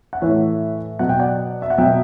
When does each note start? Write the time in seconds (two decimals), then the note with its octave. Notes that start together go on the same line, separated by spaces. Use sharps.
0.13 F#5
0.22 A2 E3 C#5 E5
0.99 B2 F#3 F#5
1.09 G5
1.20 D5 F#5
1.62 E5
1.70 F#5
1.78 B2 F#3 E5 G5